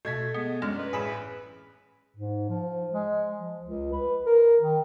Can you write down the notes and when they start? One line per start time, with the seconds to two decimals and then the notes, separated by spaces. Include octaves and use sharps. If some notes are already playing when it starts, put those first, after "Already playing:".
0.05 B2 A3 G#6 B6
0.34 G#3 B3
0.62 F#2 G#3 D4 F6
0.78 B4
0.93 A1 G#4 B5 E6
2.16 G#2
2.49 F3
2.94 G#3
3.38 F3
3.63 C#2
3.92 B4
4.26 A#4
4.61 D#3